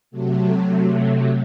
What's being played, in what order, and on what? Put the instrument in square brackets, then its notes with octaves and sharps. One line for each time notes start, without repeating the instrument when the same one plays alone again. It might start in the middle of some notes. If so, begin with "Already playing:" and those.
[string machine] C3 F#3 A3